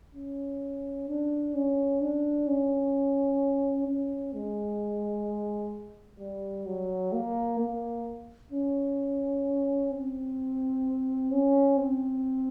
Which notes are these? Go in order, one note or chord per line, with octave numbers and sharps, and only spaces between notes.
C#4
D4
C#4
D4
C#4
C#4
G#3
G3
F#3
A#3
A#3
C#4
C4
C#4
C4